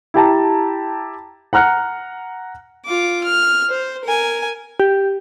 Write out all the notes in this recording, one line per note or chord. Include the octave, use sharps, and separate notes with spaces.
E4 G4 A5 A#5
F#5 A#5 F6 F#6 C#7
F4 D6
F6
C5
A#4 G#5
G4